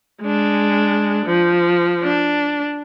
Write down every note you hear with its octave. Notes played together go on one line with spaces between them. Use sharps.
G#3 D4
F3
D4